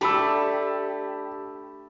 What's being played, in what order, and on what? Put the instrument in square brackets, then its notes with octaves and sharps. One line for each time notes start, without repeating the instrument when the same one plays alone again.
[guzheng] A3 D4 [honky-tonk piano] G4 [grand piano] A5 B5 E6